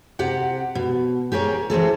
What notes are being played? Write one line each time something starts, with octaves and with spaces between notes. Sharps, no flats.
C3 G4 F#5
B2
G4 G#4 A#4 C#5
E3 C4 G#4 A4